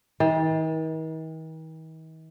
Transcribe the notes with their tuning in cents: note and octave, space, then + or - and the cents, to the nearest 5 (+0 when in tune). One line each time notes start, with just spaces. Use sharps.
D#3 +45